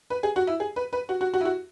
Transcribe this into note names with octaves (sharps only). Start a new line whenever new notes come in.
B4
G#4
F#4
E4
G#4
B4
B4
F#4
F#4
F#4
E4
F#4